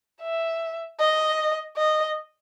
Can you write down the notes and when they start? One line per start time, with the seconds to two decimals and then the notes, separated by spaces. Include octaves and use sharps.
0.22 E5
0.99 D#5
1.77 D#5